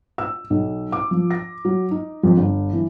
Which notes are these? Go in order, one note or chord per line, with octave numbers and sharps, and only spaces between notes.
E6
B1
D6
F3
A#6
F#3
D#4
F2
G1
E3